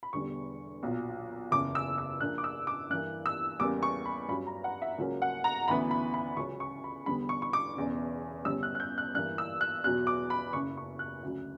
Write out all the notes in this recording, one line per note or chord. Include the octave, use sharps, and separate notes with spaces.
B5
E1 E2 D3 G3 C#6
B1 A#2 F#3
F#1 E2 C#3 D6
E6
E6
A#1 A#2 A#3 D4 F#6
D6
E6
D6
G2 E3 A#3 F#6
E6
E2 C#3 G3 A#3 D6
C#6
B5
G2 F#3 C#4 B5
A#5
F#5
E5
C#2 C#3 F#3 A#3 C#4
F#5
A#5
D2 C#3 E3 B3 B5
B5
B5
C#2 C#3 F#3 C#4 C#6
C#6
B5
E2 D3 G3 B3 B5
C#6
C#6
D6
E1 E2 C#3
G1 F#2 C#3 G3 C#4 E6
F#6
F#6
G6
F#6
G2 E3 A#3 F#6
E6
F#6
E2 B2 F#3 F#6
D6
B5
F#1 F#2 C#3 C#6
C#6
F#6
D2 C#3 F#3